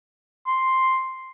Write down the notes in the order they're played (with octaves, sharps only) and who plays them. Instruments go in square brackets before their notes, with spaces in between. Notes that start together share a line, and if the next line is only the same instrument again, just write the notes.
[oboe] C6